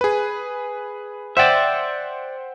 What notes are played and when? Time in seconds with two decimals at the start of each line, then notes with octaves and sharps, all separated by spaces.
0.01 G#4 B4
1.37 C5 D5 E5 F#5 G5